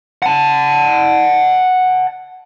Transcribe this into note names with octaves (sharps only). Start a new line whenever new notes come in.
F#5 A5